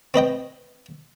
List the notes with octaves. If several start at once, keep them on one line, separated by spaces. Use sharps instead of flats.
C4 B4 D#5 G5